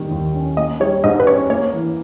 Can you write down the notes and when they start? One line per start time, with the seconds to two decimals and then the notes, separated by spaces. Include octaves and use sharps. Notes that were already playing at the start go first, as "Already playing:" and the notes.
Already playing: D#3 G3 A#3
0.11 D#2
0.34 C#4
0.57 A#3 D#5
0.80 G3 C#5
1.04 G#2 D#5
1.20 B4
1.27 C#4 C#5
1.50 A#3 C#5
1.73 E3